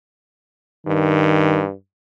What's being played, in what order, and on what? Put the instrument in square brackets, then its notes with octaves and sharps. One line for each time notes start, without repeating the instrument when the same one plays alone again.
[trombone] G2 [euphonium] D#3